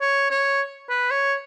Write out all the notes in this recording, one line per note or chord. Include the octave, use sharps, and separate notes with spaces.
C#5
C#5
B4
C#5